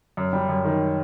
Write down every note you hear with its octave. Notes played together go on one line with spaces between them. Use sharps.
F#2
G3
F#2
D#3